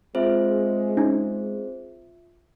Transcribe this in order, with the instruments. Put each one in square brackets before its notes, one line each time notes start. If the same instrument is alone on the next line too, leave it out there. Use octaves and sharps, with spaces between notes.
[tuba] G#3 [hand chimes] C4 G#4 C5 [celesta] F4 E5
[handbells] C#4 D#4